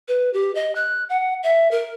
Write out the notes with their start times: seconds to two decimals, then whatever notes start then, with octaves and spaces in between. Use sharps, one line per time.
0.08 B4
0.33 G4
0.55 D#5
0.75 F#6
1.09 F#5
1.43 E5
1.71 A#4